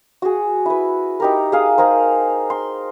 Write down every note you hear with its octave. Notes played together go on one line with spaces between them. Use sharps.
F#4 G#4
E4 B4
D#4 G4 A#4
G#4 F5 D#6
D#4 G#4 A#4 C5
C6